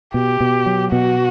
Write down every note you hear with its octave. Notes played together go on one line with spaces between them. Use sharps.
B2 G4
B2
F#3
B2 F#4